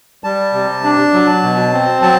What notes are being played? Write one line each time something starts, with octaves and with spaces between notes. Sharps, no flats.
G3 A5
C3
D4
F#3
B2
C4
F#3 A5